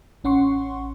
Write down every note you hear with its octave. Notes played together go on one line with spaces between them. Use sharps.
A1 C#4 F#5 C6 C#6